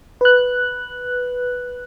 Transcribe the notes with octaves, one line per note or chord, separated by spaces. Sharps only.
B4 F#6